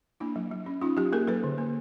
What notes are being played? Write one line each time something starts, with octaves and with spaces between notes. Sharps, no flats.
A#3 D4 E4
F#3
F#3
C#4
C#4 D#4 F4
F#3 F4 G4
A#3 G#4 A#4
F#3 A4 B4
D3
A#3